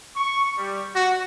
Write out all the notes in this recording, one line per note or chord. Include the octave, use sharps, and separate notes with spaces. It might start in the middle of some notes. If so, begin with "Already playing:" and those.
C#6
G3
F#4